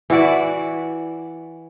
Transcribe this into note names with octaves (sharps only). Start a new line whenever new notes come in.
E3 E4 F#4 D5